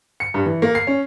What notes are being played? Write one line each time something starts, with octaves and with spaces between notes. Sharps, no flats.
C#7
G2
E3
A#3
C7
C#4